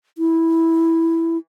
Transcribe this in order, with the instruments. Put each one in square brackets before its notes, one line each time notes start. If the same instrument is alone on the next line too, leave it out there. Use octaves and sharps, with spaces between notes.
[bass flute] E4